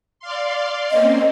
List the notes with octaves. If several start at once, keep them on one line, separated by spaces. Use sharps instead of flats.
D5 F5 C6
A#3 C4 C#4 D#5